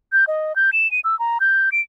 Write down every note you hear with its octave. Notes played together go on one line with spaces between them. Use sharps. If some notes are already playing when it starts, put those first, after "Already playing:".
G6
D#5
G6
E7
D#7
E6
A#5
G6
D7